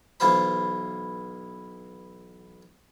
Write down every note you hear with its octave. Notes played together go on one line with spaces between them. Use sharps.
B1 E3 B3 F4 C5 B5